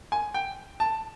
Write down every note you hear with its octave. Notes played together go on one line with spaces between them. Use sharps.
G#5
G5
A5